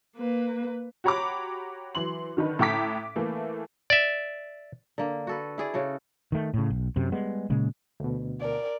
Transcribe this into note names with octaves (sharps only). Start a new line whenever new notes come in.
A#3 B4
F#4 G4 C#5 A#5 B5 D6
E3 F#3 C6 F#7
D3 D#3 D#4 B4
A2 A4 G5 A#5 D6 B6
E3 A3 A#3
D5 E5
D3 A#3
F#4 A4 B4
E4 G#4 D5
C#3 F#4 A4
D#3 A3
A2 C#3
B1
F#2 C3
G3 G#3 B3
A#2 C#3 G#3
D2 B2
A#4 D5